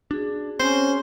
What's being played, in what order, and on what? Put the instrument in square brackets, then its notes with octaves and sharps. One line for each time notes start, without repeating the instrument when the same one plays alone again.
[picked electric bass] D4 [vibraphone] F#4 G#4
[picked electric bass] C4 [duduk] C#4 [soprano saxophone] C5